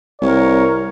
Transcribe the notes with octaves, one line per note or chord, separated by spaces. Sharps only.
C2 A#4 C#5